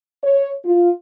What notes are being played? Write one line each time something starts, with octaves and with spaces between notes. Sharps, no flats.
C#5
F4